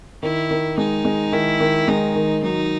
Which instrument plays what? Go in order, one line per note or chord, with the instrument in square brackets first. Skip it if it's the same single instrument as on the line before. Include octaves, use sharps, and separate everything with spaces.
[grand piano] D#3 [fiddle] E4
[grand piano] D#3
[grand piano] G#3 [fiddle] D#4
[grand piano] G#3
[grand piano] D#3 [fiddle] E4
[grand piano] D#3
[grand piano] G#3 [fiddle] D#4
[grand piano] D#3
[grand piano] F#3 [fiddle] D#4